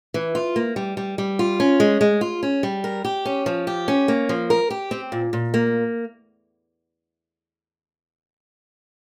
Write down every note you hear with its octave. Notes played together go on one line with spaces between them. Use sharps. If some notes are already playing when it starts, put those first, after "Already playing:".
E3
F4
A#3
G3
G3
G3
F4
C#4
G#3
G#3
F4
C#4
G3
A#4
G4
C#4
F3
G4
C#4
A#3
F3
A#4
G4
C4
A#2
A#2
A#3